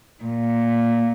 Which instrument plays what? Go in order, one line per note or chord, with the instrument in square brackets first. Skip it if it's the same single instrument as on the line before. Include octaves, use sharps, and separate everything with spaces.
[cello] A#2